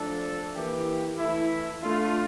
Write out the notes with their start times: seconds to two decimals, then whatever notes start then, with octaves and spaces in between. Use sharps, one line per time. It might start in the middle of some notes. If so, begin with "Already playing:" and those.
Already playing: F3 A3 D4 A4
0.55 E3 A#3 E4 G4
1.18 E3 A3 E4
1.82 A3 D4 F4